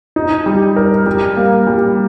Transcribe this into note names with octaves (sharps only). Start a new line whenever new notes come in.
D#4
G3
A#4
G3
A#3
G3